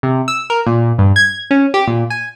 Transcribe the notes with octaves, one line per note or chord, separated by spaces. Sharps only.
C3
E6
A#4
A#2
G2
G#6
C#4
G4
A#2
G#5